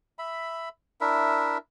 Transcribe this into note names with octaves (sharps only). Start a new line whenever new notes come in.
E5 B5
D4 E4 A#4 E5